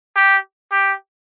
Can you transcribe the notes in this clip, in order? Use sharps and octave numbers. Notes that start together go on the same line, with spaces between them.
G4
G4